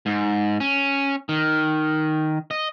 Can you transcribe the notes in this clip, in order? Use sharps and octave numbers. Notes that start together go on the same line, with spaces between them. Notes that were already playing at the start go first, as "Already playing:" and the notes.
G#2
C#4
D#3
D#5